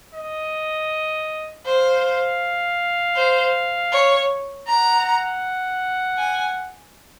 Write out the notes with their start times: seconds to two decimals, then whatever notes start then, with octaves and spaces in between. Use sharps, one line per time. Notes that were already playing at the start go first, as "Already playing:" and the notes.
0.15 D#5
1.66 C5 F5
3.16 C5
3.92 C#5
4.67 F#5 A#5
6.18 G#5